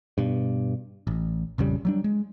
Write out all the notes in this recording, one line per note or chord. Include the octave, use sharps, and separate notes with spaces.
G2 B2
A1
A#1 F2 C#3 G3
F#3 G3 D4
G#3